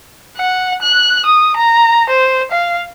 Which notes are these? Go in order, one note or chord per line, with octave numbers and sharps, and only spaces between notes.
F#5
F#6
D#6
A#5
C5
F5